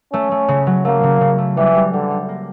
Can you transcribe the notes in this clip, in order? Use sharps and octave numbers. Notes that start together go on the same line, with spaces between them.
A3 C#4
A3
C#3
F#3
A3 A#3
C#3
C#3
A3
E3 G3
G3
D3 G3
G3
A#3